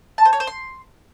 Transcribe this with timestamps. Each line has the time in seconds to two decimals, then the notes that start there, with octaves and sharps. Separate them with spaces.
0.18 A5
0.25 C5
0.33 C#5
0.40 C5
0.47 C6